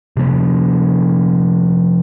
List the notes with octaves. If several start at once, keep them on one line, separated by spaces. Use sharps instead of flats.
C3 F3 A#3 C#4